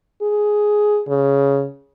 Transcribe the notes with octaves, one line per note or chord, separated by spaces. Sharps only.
G#4
C#3